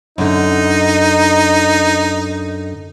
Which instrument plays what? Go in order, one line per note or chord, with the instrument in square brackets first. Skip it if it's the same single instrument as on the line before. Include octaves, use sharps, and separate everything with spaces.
[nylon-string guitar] F#2 D3 [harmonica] D#4